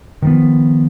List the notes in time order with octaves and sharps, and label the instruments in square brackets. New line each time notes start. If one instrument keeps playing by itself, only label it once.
[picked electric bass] D#3 F3 B3